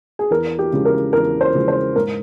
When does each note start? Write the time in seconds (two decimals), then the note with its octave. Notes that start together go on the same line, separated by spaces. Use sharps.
0.19 G#4
0.31 E2 A#4
0.59 G4
0.73 C#3 F3 G#3
0.85 A#4
1.13 E2 A#4
1.41 C5
1.54 C#3 F3 G#3
1.68 C5
1.96 G#2 A#4